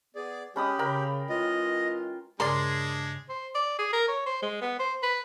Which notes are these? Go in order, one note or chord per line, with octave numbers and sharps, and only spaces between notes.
B3 G#4 D5
G#3 C#4 G4 B5 D#6
C#3 A#4 G5 B5
E3 G#3 F4 D#5
G2 C#3 G#3 D4 G#4 A#4 D5 C6
C5
D5
G#4
A#4
C#5
C5
G#3
B3
C5
B4